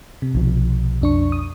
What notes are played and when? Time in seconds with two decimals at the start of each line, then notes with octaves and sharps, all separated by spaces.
0.22 C3
0.35 B1 F3
1.01 F2 D4 C#6
1.32 D#6